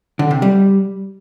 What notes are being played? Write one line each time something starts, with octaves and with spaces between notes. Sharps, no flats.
D3
C3
G3